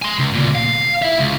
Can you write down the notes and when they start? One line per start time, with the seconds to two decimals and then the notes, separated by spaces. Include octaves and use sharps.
0.02 G#5 C6
0.19 C#2
0.34 D2 A#2
0.55 F5
1.02 E4 E5
1.19 C#2